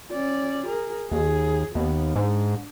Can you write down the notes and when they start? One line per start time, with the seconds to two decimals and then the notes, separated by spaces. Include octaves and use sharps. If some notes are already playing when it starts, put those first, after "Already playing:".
0.12 C#4 D5
0.67 G#4 A#4
1.11 D#2 G#4
1.75 D#2 B3
2.16 G#2 D4